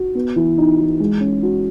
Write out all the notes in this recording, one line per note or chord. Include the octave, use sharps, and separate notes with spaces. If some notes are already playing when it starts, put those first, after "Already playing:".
Already playing: F#4
B3
E3
D#4
E3
G#3
C#4
F#4